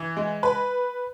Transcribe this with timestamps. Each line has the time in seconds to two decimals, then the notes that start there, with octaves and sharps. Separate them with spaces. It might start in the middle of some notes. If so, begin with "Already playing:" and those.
Already playing: E3
0.17 G#3
0.43 B4